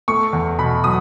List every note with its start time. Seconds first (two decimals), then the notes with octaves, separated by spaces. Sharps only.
0.08 A3 C#6
0.33 E2
0.58 B2 B5
0.84 F#3 D#6